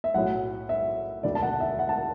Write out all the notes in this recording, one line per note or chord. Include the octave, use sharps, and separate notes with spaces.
E5
B1 A2 F#3 F#5
E5
E1 D2 D3 D5
A5
F#5
E5
F#5
A5